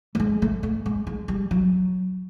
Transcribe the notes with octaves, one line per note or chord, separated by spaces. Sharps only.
A3
G#3
A3
A3
G#3
G#3
G3
F#3